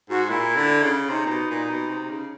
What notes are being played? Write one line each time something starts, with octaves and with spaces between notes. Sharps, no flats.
G#2 F#4
A#2 E4
D3
C#3
C3 D#4
A#2
B2
A#2
B2
C3
C#3